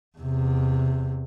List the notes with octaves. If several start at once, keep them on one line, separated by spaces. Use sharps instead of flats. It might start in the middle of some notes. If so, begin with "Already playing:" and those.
E2 C3